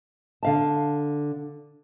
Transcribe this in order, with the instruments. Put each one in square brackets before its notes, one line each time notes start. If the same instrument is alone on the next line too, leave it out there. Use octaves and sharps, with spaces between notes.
[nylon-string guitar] D3 F5 A5